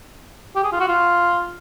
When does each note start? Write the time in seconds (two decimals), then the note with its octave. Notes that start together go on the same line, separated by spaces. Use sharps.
0.56 G4
0.64 G#4
0.72 F4
0.80 F#4
0.88 F4